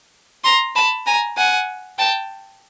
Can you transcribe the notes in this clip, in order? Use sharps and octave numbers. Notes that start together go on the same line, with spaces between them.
A#5 C6
A5 B5
G#5 A#5
F#5 G#5
G5 A5